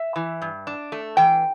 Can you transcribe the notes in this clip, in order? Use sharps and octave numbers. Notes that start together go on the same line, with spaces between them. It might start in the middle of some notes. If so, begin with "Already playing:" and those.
Already playing: E5
E3
G2
D4
A3
E3 G5